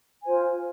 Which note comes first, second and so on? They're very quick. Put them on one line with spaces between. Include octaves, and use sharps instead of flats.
G#5 C5 F4